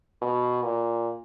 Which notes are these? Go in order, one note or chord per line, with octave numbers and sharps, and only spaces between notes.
B2
A#2